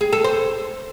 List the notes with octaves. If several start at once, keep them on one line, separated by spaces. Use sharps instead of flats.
G#4
A4
C5